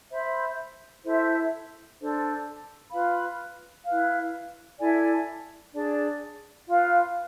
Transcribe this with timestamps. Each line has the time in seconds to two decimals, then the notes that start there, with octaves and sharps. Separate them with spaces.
0.11 C5 E5 B5
1.04 E4 A4 C5 E5
1.98 D4 A4 C5
2.92 F4 B4 F5 B5
3.85 E4 B4 F5
4.79 E4 A4 D5 G#5
5.73 D4 G#4 D5 A5
6.67 F4 B4 F5